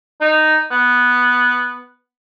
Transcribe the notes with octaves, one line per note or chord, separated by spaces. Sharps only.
D#4
B3